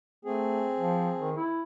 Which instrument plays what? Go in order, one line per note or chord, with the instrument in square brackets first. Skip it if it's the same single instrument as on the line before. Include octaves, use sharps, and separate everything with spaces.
[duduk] A3 [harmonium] C4 G#4
[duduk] F3
D#3
E4